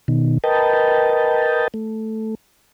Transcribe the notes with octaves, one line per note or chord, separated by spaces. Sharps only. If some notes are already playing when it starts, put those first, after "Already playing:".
B2 D#3
A#4 B4 D#5 G5 A5
A3